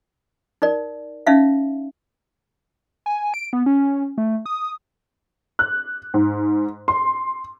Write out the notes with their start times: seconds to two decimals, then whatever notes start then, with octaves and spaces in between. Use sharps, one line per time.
0.62 D#4 A#4 D5
1.27 C#4 D#4 E5 F5
3.06 G#5
3.34 D7
3.53 B3
3.66 C#4
4.18 A3
4.46 D#6
5.59 F#6
6.14 G#2
6.88 C6